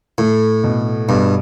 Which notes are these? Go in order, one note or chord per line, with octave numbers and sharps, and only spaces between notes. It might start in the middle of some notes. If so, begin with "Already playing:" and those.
A2 A3
B2
G2 B2